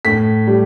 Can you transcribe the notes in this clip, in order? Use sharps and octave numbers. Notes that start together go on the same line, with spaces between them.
A2 B6
G3